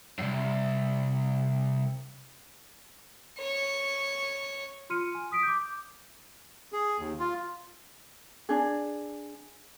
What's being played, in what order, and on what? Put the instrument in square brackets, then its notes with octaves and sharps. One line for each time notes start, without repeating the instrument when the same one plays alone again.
[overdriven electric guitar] C2 F#2
[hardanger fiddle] C#5
[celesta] F4 C6 F6 C#7 D#7
G#5
D#6 B6 D7
D6 G6
[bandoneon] G#4
D#2
F4
[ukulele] D4 G#4